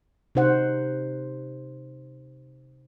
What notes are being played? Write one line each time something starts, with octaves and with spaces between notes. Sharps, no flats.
C3 D#4 C5 F#5